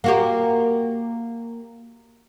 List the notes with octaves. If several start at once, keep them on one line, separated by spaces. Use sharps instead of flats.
A#3 F#4 G4